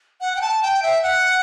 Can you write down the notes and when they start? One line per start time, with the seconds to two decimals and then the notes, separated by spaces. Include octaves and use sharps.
0.21 F#5
0.36 G5
0.41 A5
0.62 G5
0.83 E5
1.03 F#5